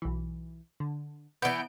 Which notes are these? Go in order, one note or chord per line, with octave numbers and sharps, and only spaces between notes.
B1 E3
D3
E3 B3 G6 D7